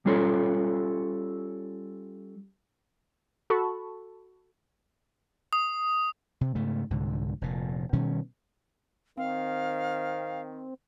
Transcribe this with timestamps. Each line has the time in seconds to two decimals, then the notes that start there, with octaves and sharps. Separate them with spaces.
0.06 G3 C#4 F4 A4 C#5
3.50 F#4 A4 A5 B5 C#6
5.53 D#6
6.41 C3
6.55 G#2 C#3 A3
6.90 C2 G#2 D3
7.41 F1 A#2
7.93 B2 D#3 G3 C#4
9.17 D#3 C4 F5